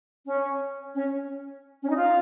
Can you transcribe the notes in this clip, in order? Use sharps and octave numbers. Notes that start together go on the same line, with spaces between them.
C#4
C#4
C#4
D#4
F4